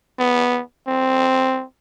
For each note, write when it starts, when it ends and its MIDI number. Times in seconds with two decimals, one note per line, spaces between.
0.19 0.61 59
0.88 1.64 60